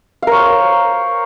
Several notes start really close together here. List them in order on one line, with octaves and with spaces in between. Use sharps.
F5 A#4 C#5 C5